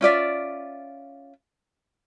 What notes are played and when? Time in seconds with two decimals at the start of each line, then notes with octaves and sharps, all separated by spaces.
0.01 C#4 F4 D5 E5